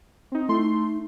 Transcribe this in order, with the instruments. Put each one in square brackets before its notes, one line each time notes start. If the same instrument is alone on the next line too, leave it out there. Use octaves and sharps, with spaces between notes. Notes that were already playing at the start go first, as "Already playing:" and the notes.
[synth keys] C4 D#4
[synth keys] A3 C6 [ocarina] E4
[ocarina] D#4